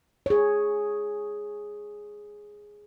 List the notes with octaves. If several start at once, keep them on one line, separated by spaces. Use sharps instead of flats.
G#4 C#5